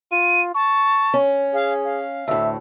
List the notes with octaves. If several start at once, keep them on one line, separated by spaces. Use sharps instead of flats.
F4 D#7
A5 C#6
C#4
G#4 F5
F5
D2 A2 E5